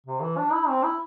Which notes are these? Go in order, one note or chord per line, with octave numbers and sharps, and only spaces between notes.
C3
E3
D4
E4
C4
E4